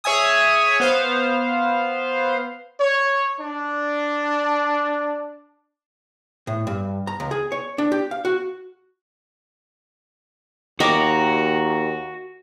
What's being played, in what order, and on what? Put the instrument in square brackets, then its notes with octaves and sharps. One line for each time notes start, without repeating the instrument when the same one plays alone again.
[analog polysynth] G#4 C#5 E5 G#5 D#6
B3 C5 F5
[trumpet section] C#5
D4
[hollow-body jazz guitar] A2
G2
A#5
C#2
G#4
C#5
D4
G4
F5
F#4
[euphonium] D#2 [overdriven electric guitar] F#4 [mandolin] A#4 C#5 D6 [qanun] D#5 G5 B5